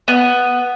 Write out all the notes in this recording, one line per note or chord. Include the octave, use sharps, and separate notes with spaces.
B3